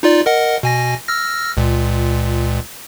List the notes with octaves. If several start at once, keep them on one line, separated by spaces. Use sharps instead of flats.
D#4 F4 D5
A#4 D#5 F#5
B2 G#5 A#6
E6 F6 A#6
C#2 A#2